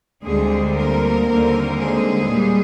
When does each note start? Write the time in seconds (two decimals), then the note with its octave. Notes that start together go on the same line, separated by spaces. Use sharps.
0.24 D2 D3 G3 G#3 C4 G#4
0.76 A#3 A#4
1.27 D#2 D3 G3 C4
1.78 G#3 G#4
2.30 A#2 G3